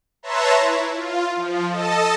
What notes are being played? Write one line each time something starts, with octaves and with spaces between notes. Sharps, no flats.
B4 C#5 E5 A5 A#5 C6
E4
F4
F3
A4 D#5 A5